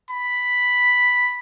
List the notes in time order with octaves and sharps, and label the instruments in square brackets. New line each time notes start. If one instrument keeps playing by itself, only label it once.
[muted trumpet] B5